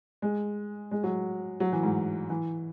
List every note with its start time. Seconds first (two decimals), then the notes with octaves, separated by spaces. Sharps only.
0.22 G#3
0.91 G#3
1.03 F#3
1.60 F#3
1.72 E3
1.83 G#2
2.30 E3